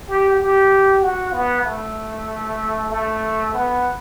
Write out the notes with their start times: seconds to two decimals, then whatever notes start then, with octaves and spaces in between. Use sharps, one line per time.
0.09 G4
0.39 G4
1.02 F#4
1.33 B3
1.64 A3
2.91 A3
3.53 B3